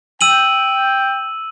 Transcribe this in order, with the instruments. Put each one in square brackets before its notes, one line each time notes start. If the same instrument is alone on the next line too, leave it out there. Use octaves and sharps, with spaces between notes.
[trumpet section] G5 [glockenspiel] E6 D#7 F#7